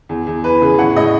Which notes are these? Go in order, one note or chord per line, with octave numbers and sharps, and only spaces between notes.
E2
E2
E3 B4
C#3
A2 F#5
A2 D#5